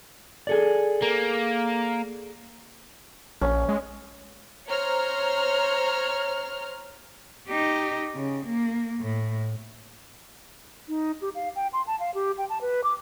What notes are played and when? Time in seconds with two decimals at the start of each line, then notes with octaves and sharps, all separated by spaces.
0.47 G#4 A4 D5
1.02 A#3
3.41 A#1 C#4
3.69 G#3
4.67 C5 C#5 A#5 F6
7.48 D#4 G4
8.16 C#3
8.46 A#3
9.00 A2
10.89 D#4
11.22 G4
11.35 F5
11.56 G5
11.73 C6
11.87 A5
12.00 F5
12.14 G4
12.38 G5
12.50 A5
12.61 B4
12.84 D6